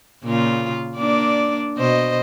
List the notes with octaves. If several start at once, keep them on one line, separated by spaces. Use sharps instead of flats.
A#2 C#3 F4
A#3 D4 D5
B2 C5 D#5